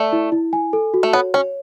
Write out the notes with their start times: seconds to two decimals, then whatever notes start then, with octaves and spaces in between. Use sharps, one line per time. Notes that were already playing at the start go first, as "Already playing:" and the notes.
Already playing: A3 D5
0.13 E4
0.32 E4
0.53 G#5
0.73 A4
0.94 F#4
1.03 A3
1.13 B3 C#5
1.34 C#4 C#5